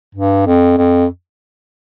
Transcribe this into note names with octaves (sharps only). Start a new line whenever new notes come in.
G2
F2
F2